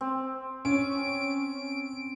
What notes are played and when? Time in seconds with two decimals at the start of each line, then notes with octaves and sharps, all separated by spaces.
0.01 C4
0.65 C#4 D7